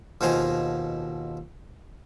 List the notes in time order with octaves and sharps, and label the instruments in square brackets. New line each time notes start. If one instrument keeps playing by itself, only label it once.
[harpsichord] D#2 B2 F3 C5 G#5 A#5